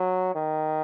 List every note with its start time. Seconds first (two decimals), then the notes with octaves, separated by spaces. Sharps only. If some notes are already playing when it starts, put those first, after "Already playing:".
Already playing: F#3
0.35 D#3